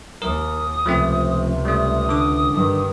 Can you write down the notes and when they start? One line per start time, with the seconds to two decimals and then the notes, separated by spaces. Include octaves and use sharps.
0.22 D#2 A#4 D#6
0.86 C#2 C3 F3 A3 C4
1.65 G3 A3 D#6
2.09 D3 D6
2.51 G2 D#3